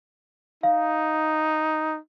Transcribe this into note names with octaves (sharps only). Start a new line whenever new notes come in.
D#4 F5